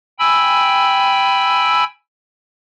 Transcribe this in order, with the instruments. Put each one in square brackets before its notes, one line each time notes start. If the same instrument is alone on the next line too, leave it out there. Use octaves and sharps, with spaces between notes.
[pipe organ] G5 G#5 B5 E6